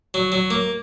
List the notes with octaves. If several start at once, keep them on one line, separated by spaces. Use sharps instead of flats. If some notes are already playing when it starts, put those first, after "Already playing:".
F#3
F#3
A#3